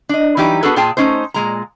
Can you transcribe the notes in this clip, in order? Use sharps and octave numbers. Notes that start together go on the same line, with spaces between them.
D4 D#5
E3 F#3 G3 D#4 G4 B4
B3 D4 F#4 G#4 A4 B4
A#2 F4 G#4 G5 A5
A3 A#3 C#4 D#4 C5
A#2 G#3 A#5